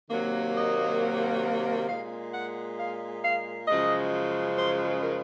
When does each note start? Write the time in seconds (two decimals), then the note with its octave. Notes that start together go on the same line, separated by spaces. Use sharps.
0.09 C3 D#3 F#3 A#3
0.55 D#5
1.89 A#2 G#3 F5
2.34 F#5
2.79 F5
3.23 F5
3.68 F#2 C#3 F3 G#3 D#5
4.57 C5
5.03 A#4